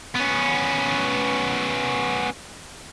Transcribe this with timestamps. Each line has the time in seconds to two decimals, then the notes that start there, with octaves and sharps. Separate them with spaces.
0.15 B3 C#4